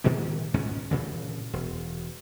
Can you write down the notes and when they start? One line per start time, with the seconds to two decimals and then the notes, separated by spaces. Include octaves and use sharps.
0.04 A#2 D#3 G#3 A#3
0.54 C#2 G#2 B2 C#4
0.91 G2 A#2 C#3 E3
1.53 E1